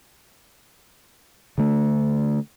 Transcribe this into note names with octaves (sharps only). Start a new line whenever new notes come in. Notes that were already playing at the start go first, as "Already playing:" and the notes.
D3 A3